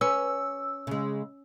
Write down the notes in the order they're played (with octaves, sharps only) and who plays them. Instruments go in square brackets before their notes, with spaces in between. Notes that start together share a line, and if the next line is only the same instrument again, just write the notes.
[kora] C#4 [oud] B4 [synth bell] E6
[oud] C#3 G#3